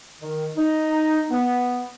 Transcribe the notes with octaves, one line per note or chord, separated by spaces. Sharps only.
D#3
D#4
B3